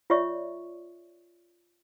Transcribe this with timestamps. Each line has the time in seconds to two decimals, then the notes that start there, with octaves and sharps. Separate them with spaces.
0.10 F4 C#5 D5 E5 C#6